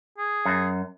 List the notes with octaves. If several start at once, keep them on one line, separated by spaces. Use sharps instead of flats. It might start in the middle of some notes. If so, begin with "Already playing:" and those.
G#4
F#2